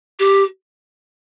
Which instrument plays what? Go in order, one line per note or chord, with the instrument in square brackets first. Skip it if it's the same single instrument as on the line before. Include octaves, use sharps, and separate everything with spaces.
[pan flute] G4